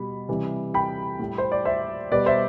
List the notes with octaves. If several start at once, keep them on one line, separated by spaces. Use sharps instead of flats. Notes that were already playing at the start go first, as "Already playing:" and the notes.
Already playing: B2 G3 B5
C3 E3 G3
G5 B5
A2 G3
C5
D5
C5 E5
B2 G3 B4 D5
C5 E5